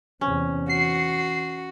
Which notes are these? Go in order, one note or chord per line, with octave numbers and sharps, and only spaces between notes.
E2 C3 C#4
E3 F#4 C7